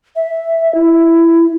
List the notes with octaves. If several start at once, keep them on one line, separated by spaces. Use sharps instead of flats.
E5
E4